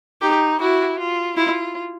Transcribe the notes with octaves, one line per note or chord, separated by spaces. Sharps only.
D#4 G4
E4 F#4
F4
E4 F4